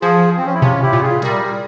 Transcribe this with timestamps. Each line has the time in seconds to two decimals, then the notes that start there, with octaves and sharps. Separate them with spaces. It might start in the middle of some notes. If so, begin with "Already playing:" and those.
0.02 F3 F4 G#4
0.37 C4
0.45 C#4
0.54 E4
0.62 C3 C#4 F4
0.82 E4 G4
0.93 A#2
1.02 F4 G#4
1.22 G3 G4 A#4